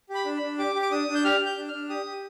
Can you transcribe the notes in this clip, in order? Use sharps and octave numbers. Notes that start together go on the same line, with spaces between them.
G4
B5
D4
D4 B5
G4 D6
G4
D6
D4 D#6
D4
G6
G4 F6
G4
G6
D4
F6
D4
G4 D#6
G4